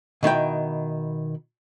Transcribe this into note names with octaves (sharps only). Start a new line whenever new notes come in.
B2 D#3 E4 G5